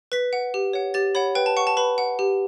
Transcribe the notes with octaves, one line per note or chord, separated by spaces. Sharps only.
B4 B6
F#5
G4
C#5 F#5
G4 A6
C#5 F#5 B5
B4 G5
A5
F#5 C#6
A5
B4 B5
F#5
G4